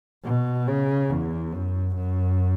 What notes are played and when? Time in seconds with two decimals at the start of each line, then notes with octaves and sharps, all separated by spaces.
0.24 B2
0.67 C#3
1.10 E2
1.53 F#2
1.96 F#2